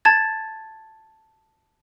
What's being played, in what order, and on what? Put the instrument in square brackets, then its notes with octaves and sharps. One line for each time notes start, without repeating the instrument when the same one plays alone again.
[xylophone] A5 G#6 A6